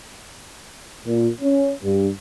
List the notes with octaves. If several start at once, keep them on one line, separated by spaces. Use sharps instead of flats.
A#2
C#4
G2